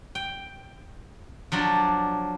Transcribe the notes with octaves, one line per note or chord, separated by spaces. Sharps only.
G5
F3 F#3 D4 D5